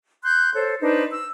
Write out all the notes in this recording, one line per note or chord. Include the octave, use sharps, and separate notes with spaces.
C6 F#6 G6
A4 C5 C#5
D4 D#4 B4 C5
E6